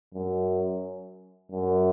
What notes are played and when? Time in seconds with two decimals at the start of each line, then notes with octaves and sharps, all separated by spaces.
0.14 F#2
1.51 F#2